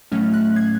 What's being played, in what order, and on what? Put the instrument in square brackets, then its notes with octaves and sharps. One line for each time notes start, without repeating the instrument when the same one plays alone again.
[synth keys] A2 F#3 A3 C#4 F6
F#6
G#6